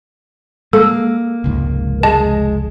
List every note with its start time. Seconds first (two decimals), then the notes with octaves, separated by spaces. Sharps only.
0.73 G#3 A#3 A4
1.44 F1 C#2 G#2
2.03 G#3 D#5 A5